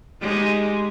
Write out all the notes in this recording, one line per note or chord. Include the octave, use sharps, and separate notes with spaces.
G#3 D#4 G4